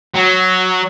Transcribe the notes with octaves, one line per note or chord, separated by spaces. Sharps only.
F#3